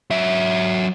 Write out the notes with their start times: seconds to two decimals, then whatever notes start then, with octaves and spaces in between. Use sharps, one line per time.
0.10 F#3 E5